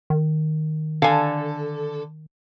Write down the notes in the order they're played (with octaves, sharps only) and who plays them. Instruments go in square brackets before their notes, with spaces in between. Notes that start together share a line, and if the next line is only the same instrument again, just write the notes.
[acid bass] D#3
[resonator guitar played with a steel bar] D3 A4 [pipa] F5 G#5